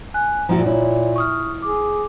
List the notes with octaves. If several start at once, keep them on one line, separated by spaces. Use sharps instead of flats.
G#5 F#6
A#2 F3 E4 F#4 F#5 A#5
E4 C#5
C#6 D#6 F6
G#4 D6